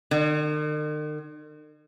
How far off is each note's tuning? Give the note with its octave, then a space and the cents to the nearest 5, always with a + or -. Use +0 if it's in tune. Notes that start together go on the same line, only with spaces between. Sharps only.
D#3 -45